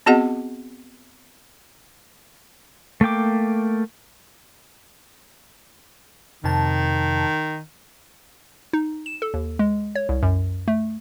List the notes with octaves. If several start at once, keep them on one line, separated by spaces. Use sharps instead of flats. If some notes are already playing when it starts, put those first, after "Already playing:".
B3 C4 F#4 G#4 D#5 F#5
A3 A#3 G5 D6
F2 C3 D#3 A5
D#4
E7
A4
D#2
G#3
C#5
C2
F#2
A3